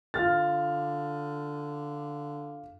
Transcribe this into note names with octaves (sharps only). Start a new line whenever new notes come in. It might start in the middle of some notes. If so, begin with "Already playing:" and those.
D3 F4 F6 A6